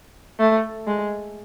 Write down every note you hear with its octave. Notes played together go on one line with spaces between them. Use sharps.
A3
G#3